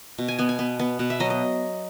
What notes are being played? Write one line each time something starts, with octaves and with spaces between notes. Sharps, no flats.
B2
G#5
B3 G#5
G#5
B3
B3
B2 F#5
E5
F#3 D#5
D#5